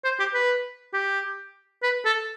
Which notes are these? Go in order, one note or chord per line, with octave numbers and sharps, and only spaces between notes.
C5
G4
B4
G4
B4
A4